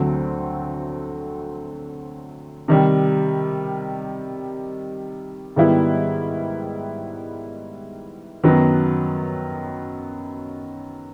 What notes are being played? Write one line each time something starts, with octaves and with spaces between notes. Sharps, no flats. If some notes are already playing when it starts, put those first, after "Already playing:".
Already playing: D2 D3 F#3 A3 C4
C3 D#3 G3
G#2 D#3 G3 B3 E4
F#2 D#3 F#3 B3